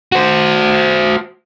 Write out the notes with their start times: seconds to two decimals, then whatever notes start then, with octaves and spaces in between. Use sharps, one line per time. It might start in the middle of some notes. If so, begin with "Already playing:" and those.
0.12 F#4 C5